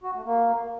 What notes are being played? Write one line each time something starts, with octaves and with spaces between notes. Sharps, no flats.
F#4
A3
A#3